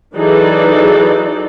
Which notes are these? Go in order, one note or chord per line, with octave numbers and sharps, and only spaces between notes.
E3 F#3 D#4 G#4 A4 D5